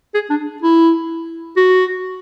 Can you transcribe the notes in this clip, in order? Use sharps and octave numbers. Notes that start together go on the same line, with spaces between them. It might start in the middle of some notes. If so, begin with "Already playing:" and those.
G#4
D4
E4
F#4